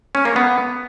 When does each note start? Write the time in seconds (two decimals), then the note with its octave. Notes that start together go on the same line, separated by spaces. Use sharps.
0.15 C#4
0.25 A#3
0.36 B3